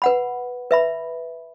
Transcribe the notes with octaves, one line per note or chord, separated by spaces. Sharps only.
B4 F#5 B5
B4 E5 B5